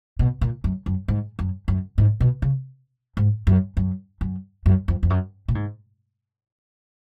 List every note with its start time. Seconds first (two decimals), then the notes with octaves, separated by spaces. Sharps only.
0.19 B2
0.41 A#2
0.64 F#2
0.86 F#2
1.08 G#2
1.39 F#2
1.68 F#2
1.98 G#2
2.20 B2
2.42 C#3
3.17 G#2
3.47 F#2
3.77 F#2
4.21 F#2
4.66 F#2
4.88 F2
5.03 F2
5.10 F#2
5.48 A#2
5.55 G#2